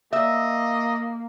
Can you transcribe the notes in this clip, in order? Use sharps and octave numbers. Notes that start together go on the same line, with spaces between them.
A#3 D#5 E5